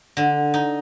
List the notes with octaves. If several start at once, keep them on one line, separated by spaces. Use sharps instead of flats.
D3
D#4